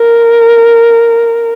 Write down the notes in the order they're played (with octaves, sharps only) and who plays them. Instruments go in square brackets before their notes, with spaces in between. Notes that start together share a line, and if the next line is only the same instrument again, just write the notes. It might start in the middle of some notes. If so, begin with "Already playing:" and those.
Already playing: [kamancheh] A#4